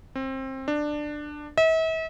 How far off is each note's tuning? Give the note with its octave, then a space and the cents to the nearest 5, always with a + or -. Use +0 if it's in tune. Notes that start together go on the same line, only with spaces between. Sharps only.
C4 +25
D4 +15
E5 -40